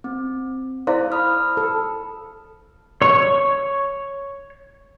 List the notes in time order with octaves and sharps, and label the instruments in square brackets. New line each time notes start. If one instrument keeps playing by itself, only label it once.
[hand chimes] C4
[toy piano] E4 C5 F5 [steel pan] D5
[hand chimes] B5 D#6 F6
[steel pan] A4
[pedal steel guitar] C#5 C#6